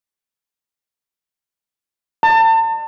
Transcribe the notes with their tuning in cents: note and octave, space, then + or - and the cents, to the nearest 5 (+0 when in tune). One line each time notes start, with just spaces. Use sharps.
A5 +35